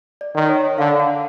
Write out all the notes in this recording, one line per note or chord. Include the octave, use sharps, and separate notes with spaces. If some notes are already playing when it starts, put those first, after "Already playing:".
D5
D#3
C#5
D3 F5
F#5